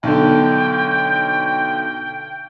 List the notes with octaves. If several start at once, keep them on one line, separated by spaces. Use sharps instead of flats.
B1 D3 G5